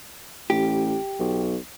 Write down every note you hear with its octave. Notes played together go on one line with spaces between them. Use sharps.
A1 G4
B1